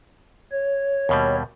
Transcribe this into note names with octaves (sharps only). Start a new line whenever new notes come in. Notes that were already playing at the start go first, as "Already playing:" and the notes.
C#5
D#2 B2 G3